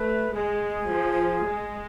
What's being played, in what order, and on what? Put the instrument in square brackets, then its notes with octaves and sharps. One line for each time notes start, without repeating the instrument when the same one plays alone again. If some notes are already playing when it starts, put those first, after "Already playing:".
Already playing: [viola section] A3 [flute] B4
[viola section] G#3 [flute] G#4
[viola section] F3
G#3